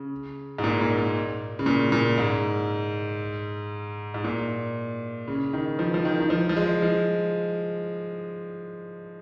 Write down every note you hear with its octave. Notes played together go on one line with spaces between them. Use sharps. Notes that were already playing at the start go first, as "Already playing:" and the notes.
Already playing: C#3
G#2
A#2
A#2
A#2
C#3
A#2
A#2
G#2
G#2
A#2
C#3
D#3
F3
F3
D#3
D#3
F3
F3
G#3
F3